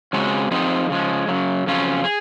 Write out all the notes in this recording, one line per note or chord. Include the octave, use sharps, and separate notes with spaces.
C#3 G#3 C4 F#4
F3 C4 D#4 G#4
C#3 F3 G#3
F#2 C#3 F#3
F2 C#3 F#3 C#4 F4
G#4